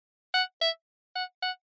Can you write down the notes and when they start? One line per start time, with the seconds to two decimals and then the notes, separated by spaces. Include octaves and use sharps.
0.34 F#5
0.61 E5
1.15 F#5
1.42 F#5